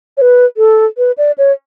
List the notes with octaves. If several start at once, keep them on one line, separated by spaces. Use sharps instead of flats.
C#5
B4
A4
B4
D5
C#5